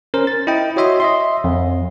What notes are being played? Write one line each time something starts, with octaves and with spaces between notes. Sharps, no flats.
C#4 A#4 C5
A6
E4 D#5 G5
F#4 C#5 D#5 E5 C6 D#6
D#5 E5 C6
F2